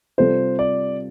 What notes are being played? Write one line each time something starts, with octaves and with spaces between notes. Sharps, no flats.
C3 G3 F4 A4 C5
D5